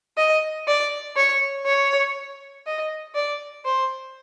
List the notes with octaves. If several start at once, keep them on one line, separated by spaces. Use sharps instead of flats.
D#5
D5
C#5
C#5
D#5
D5
C5